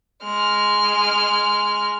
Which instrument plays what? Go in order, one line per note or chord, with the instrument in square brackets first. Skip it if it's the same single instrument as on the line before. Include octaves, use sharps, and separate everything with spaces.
[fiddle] G#3 F6